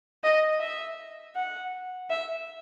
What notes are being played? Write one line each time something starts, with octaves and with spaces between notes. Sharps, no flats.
D#5
E5
F#5
E5